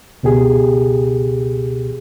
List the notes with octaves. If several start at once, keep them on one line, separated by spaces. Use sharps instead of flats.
C#2 B2 G4 G#4